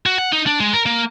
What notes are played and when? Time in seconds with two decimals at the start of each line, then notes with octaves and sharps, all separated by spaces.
0.06 F#4
0.18 F#5
0.32 D#4
0.47 D4
0.60 G#3
0.73 A#4
0.86 A#3